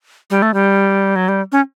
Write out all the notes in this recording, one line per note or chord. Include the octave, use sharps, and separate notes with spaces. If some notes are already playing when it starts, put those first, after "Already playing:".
G3
A3
G3
F#3
G3
C#4